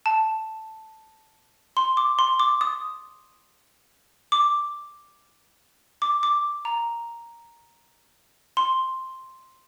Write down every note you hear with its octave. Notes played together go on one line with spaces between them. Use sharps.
A5
C6
D6
C6
D6
D#6
D6
D6
D6
A#5
C6